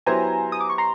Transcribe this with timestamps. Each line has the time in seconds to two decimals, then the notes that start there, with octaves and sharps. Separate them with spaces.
0.06 F#3 B3 E4 G4 C5 G#5 A#5
0.52 D#6
0.60 D6
0.70 C#6
0.78 A#5 C6